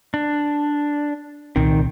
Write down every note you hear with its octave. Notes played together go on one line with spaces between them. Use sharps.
D4
C2 A#2 D#3 C4